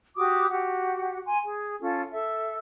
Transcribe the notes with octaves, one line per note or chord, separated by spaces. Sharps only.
F#4 G4 D6 D#6
F#4 G4 F#5
G#5 C6
G#4
C#4 F4 A4
A4 E5